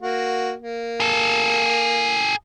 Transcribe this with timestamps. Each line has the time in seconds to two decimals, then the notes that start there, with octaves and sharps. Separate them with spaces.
0.02 A#3 F#4
0.62 A#3
1.00 G#4 A4